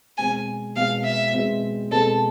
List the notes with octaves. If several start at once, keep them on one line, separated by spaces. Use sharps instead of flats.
B2 G#3 C4 G#5
B2 G#3 C4 F5
E5
B2 G#3 C4
B2 G#3 C4 A4